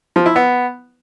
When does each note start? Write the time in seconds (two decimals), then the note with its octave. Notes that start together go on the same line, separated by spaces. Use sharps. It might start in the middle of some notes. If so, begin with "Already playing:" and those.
0.16 F3
0.26 E4
0.36 B3